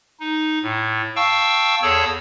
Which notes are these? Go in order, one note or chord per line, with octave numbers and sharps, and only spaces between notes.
D#4
A2
F5 G5 A5 C#6 E6
E2 G#4 A4 C#5 A5 E6